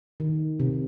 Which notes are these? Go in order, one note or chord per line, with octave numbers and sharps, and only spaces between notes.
D#3
C3